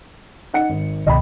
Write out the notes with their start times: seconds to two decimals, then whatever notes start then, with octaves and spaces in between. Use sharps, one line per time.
0.53 D#4 F#5 C#7
0.70 G#1
1.07 C#2 B2 D#3 D#5 G5 B5